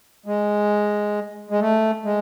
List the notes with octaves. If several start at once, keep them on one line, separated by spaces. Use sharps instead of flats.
G#3
G#3
A3
G#3